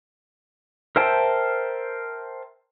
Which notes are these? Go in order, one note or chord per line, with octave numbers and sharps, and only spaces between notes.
A#4 C5 E5 G5 A5